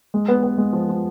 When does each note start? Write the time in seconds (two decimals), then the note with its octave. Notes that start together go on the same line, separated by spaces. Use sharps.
0.14 G#3
0.28 B3
0.43 B3
0.58 G#3
0.73 F3
0.89 F3